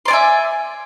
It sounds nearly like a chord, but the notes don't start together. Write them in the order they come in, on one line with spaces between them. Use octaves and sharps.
C6 D5 G#5 E5